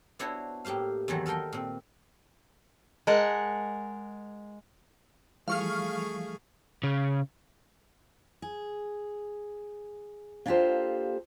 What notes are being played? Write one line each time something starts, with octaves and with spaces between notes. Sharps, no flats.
B3 D4 E4 F#4 C5 C#5
A2 A#3 G4 C5 F5
E2 D#3 E3 F#3
A4 A#4 D#5 G5 C6
A#2 C4
G#3 G#4 A#4 F#5 A5
E3 F3 G3 A3 G#4 F5 C#6 F6
C#3
G#4
A#3 D4 F4 G4 A4 C5